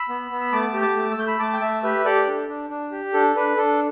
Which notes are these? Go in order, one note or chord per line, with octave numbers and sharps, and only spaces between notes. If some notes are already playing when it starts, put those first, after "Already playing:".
Already playing: B5 E6
B3
B3
E6
A3 A5 D6
G4
A5 D6
A3
E6
A3 G6
B5 E6
A3 A5 D6
G5
A3 E5 A5
G4 B4 E5
G4 A4 D5
D4
D4
D4
G4
D4 A4
D4 B4
D4 A4